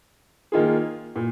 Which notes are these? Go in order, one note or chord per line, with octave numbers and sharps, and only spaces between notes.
D#3 A#3 F4 G#4
A#2